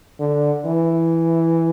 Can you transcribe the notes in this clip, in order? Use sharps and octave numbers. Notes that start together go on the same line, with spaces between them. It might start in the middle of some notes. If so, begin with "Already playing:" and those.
D3
E3